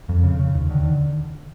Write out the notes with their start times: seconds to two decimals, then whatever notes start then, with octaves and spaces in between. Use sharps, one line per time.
0.09 F2
0.24 C#3
0.39 C#3
0.55 D#2
0.70 D3 D#3
0.85 D3